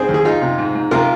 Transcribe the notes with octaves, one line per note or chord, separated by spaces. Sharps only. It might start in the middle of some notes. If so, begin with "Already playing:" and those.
Already playing: C2 C4 G#4 C5
D#2
G#4
D#4 F4
C3
G#2
G#2
C3 F4 A#4